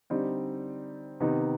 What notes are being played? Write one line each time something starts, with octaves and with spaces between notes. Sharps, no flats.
D3 G3 C4 D#4
C3 D#3 B3 D#4